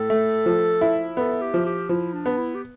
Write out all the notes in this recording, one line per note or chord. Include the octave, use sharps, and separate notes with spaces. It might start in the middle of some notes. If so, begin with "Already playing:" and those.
Already playing: A2 A4
A3
F3
E4
B3 A4
G4
F3
G4
F3 E4
D4
B3
E4
G4